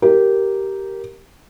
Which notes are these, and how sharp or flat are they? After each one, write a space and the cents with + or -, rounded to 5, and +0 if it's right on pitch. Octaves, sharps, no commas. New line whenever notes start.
G4 -10 A#4 +0